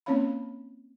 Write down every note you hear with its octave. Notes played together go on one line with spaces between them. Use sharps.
A#3 C4 C#4 C#5 F5 B5